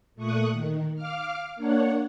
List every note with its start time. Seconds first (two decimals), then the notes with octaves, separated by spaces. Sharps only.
0.15 A#2 A3 C#6 D#6 F#6
0.50 D#3
0.95 F5 D6 F6
1.56 A#3 D4 C#5 F#5